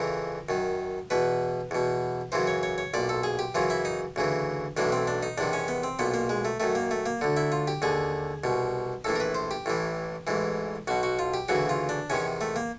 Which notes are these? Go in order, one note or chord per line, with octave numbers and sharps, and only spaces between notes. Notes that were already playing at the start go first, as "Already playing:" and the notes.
Already playing: F2 C#3 E3 A#4
F#2 D#3
E2 B2 B4
E2 B2
F#2 C#3 E3 C5
C#5
C#5
C#5
B1 A#2 D5
A4
G#4
G4
F#2 C#3 E3 F4
E4
D#4
D2 C#3 E3
B1 A2 E3 D4
C4
D4
D#4
E2 C3 D#3 D4
C#4
B3
C4
B1 A#2 B3
A#3
G#3
A3
F#2 D#3 A3
A#3
A3
A#3
D2 D3
E4
F4
G4
D#2 D3 G#4
C2 B2
A#1 A2 E3 A4
A#4
B4
C5
G4
A1 A2 E3
A1 G#2 E3
B1 B2 F#4
F#4
F4
G4
D2 C#3 E3 F#4
F4
D4
E2 C3 D#3 C#4
A3
A#3